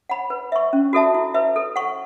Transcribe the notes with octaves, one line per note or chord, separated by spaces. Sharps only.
F#5 B5
B4
E5 C#6
C#4
F#4 A4 E5 A5
E4
B4 E5
A4
F#5 C#6